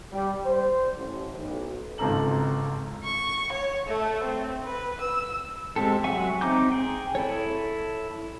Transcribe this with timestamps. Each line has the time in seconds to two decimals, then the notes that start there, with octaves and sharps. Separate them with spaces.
0.12 G3
0.45 C5
0.97 A1
1.39 B1
1.98 G#1 C#2 C4 A4 A#5 F#7
3.04 C#6
3.52 C#5
3.87 A3
4.24 C4
4.64 B4
5.01 E6
5.76 G#3 C4 G4 A4
6.04 F#3 E5 F#5 G#5 C#6
6.41 C4 D#4 A#5 D6 G6
6.72 G#4 G5
7.15 E4 A4 C#5